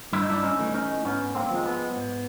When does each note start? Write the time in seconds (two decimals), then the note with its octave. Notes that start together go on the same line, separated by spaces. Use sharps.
0.13 G2 E4
0.22 D#4
0.30 D4 E4
0.44 C#4 D#4
0.59 E3 A3
0.74 C#4 D#4
1.04 G#2 B3 C#4
1.35 A#3 C4
1.50 F3 G#3
1.66 B3
1.96 G#2